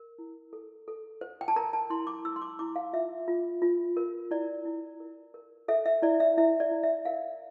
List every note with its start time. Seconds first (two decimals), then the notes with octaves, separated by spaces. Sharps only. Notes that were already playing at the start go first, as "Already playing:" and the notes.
Already playing: A#4
0.19 E4
0.53 A4
0.88 A4
1.21 C5
1.41 G5
1.48 A5
1.56 A#4 A#5
1.73 A5
1.90 E4 C6
2.07 D6
2.25 E4 E6
2.36 C6
2.42 D6
2.59 E4 D6
2.76 F5
2.93 F4 E5
3.28 F4
3.62 F4
3.97 A#4
4.31 E4 D5
4.65 E4
5.00 A#4
5.34 A#4
5.68 A4 E5
5.86 E5
6.02 E4 D5
6.20 E5
6.37 E4 E5
6.60 D5
6.71 E4
6.83 E5
7.05 A#4 F5